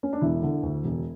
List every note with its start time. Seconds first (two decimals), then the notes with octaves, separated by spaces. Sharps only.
0.03 C#4
0.13 D4
0.21 E1 E4
0.43 D3
0.63 D2
0.84 E1